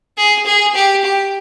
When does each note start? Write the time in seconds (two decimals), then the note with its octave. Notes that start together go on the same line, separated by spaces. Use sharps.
0.18 G#4
0.46 G#4
0.75 G4
1.05 G4